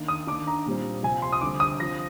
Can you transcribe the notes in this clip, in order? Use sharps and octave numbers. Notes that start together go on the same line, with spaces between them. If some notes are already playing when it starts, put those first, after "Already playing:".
Already playing: D#3 A#3 D4
D#6
D#3 A#3 D4 D6
A#5
A#2 G3 C4
C3 F3 C4 G#5
C6
D#6
D3 G3 C4 D6
D#6
F3 C4 A#6